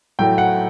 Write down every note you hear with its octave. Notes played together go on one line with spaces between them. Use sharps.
A2 F#3 A3 G5
F#5